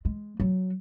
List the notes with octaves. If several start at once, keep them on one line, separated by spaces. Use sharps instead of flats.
G#3
F#3